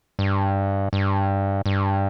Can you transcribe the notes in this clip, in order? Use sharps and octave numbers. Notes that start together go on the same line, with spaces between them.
G2
G2
G2